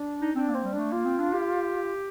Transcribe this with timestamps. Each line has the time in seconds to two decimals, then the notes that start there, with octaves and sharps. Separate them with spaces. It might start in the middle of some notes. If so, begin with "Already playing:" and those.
Already playing: D4
0.21 D#4
0.35 C4 D4
0.49 A#3
0.54 C4
0.63 G3
0.73 D4
0.78 A3
0.91 A#3 F4
1.05 C4
1.19 D4
1.33 G4